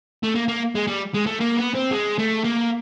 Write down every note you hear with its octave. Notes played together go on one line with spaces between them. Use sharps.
A3
A#3
A#3
G#3
G3
G#3
A3
A#3
B3
C4
G#3
A3
A#3